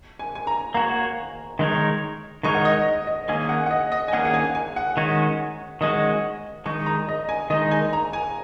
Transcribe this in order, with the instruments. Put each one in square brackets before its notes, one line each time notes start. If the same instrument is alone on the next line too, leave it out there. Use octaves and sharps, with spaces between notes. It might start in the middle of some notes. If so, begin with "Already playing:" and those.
[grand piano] G#5
G#5
A#5
[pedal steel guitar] A#3 F#4 C#5 [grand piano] A#5
[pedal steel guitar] D#3 G#3 D#4 A#4 C#5
[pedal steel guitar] D#3 G#3 D#4 A#4 C#5 [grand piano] C#6
[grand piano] F#5
D#5
D#5
[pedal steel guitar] D#3 A#3 C#4 G#4 [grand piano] G#5
[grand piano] F#5
F#5
D#5
D#5
G#5
[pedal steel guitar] D#3 A#3 C#4 G#4 [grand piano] F#5
[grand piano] F#5
G#5
G#5
F#5
[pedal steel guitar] D#3 G#3 C#4 F#4
[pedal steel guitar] D#3 G#3 C#4 F#4 [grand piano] D#5
[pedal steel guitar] D#3 G#3 D#4 [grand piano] C#6
[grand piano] A#5
D#5
G#5
[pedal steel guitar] D#3 G#3 D#4 [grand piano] D#5
[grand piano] G#5
A#5
G#5